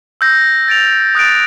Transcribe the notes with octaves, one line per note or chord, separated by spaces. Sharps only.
E6 G6 A#6
A6 D7 F7
D#6 F#6 A6 D7